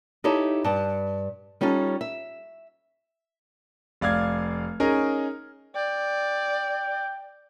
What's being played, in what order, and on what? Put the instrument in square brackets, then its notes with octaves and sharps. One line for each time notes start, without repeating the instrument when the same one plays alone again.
[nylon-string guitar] D#4 E4 G4 A4 C#5 E5
G2 A5
G3 C#4 D#4 F4 A4
E5
[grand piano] F1 D5 F5 F6 G#6
C#4 D#4 G#4 A#4
[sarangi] D5 [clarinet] G5